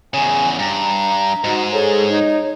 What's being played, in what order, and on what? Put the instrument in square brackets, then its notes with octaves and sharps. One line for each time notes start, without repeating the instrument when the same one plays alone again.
[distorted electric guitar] E2 C#3 [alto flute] G#5
[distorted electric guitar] G2 [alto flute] A#5
[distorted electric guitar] G#2 [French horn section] D#4 F#4
[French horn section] G#4 A4 [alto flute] C#5
[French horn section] D#4